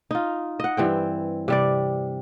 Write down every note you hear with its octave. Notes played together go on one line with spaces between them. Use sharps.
D#4 F4
D#5 F#5
G2 E3 C4 G5
C3 G3 D5